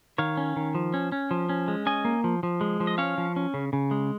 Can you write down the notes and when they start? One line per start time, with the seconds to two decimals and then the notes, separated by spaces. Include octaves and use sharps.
0.18 D#3 C#5 F5
0.37 C#4
0.56 D#3
0.75 F3
0.94 C#4
1.12 C#4
1.31 F3
1.49 C#4
1.68 G#3
1.86 C#4 D#5 G#5
2.05 A#3
2.24 F3
2.43 F3
2.61 G#3
2.80 F3
2.87 D#5
2.98 C#4 C#5 F5
3.18 F3
3.36 C#4
3.54 C#3
3.73 C#3
3.91 G#3